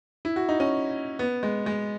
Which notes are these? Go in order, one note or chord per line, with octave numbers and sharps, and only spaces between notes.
E4
F#4
D#4
C#4
B3
G#3
G#3